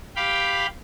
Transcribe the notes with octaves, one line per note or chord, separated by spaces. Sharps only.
G4 F5 G5 B5